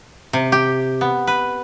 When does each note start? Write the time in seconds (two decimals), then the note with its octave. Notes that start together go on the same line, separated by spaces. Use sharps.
0.33 C3
0.52 G4
1.01 B3
1.27 B4